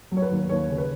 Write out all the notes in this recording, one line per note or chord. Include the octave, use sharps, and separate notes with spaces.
F#3
C#5
B4
D#2
D#2 C#5
C#3
B4